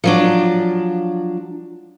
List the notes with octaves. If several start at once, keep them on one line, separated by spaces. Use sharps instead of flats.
F3 F#3 D4